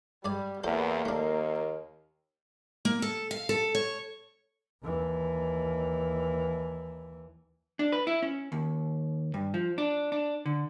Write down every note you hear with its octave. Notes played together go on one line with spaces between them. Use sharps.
G2 G3 D5 G#5
E2 A#3 A4 C5
D#2 A3 D4
A#3
A4
F5
A4
C#5
D#2 E3
D4
B4
E4
C#4
D#2
G2
F3
D4
D4
D3